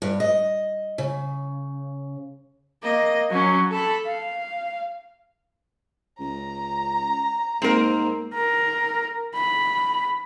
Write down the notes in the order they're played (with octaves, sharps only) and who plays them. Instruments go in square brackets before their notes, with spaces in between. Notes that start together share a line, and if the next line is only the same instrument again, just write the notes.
[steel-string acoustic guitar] G2
D#5
C#3
[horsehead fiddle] A#3 D#5
F#3 C#4
A4 B5
F5
[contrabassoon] C#2 [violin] A#5
[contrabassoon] G#2 [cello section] A#3 [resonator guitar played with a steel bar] C4 A#4
[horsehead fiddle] A#4
B5